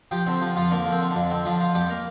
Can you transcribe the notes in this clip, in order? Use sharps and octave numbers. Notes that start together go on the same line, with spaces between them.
F3 G4 G5
D3 C4 C5
F3
F2 F3 F4
D3 A#3 A#4
F3
C4
D3
F2 D4
D3 C4
F3 D4
F3 F4
F2 G3 G4
A#3 A#4